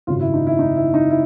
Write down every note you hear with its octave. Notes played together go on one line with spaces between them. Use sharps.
G#1 F#2 C#3 F4
E4
D#4
E4
D#4
E4
D#4
E4